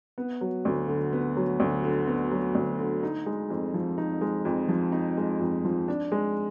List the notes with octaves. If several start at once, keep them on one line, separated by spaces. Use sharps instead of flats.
B3
F#3
D2
D3
B3
F#3
D2
D3
B3
F#3
D2
D3
D#4
G#3
F2
F3
D#4
G#3
F2
F3
D#4
G#3
F2
F3
D4
G#3